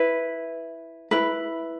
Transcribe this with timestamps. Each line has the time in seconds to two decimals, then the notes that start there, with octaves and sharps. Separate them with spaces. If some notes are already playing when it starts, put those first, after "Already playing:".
Already playing: E4 B4
1.11 E4 B4